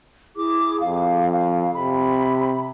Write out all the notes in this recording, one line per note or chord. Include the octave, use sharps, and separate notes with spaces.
E4 G#4 D6
F2 F5
F5
C3 B5